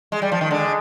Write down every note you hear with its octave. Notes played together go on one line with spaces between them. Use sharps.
G#3
G3
F3
D#3
D3 G#3